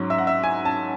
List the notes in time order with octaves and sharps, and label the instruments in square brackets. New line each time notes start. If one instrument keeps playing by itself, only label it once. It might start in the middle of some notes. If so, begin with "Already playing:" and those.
Already playing: [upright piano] G#2 F#3 C#4
E5
F#5
E5
G#5
A5